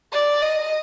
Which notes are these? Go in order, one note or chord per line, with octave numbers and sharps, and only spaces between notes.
D5
D#5